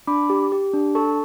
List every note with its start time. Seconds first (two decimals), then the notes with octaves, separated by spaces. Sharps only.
0.07 D4 B5 D6
0.30 G4
0.52 G4
0.73 D4
0.95 A4 A5 C#6